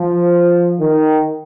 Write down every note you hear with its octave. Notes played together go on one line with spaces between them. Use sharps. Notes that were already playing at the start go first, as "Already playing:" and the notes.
Already playing: F3
D#3